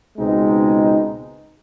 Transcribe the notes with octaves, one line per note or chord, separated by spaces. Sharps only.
C#2 B2 G#3 C4 D#4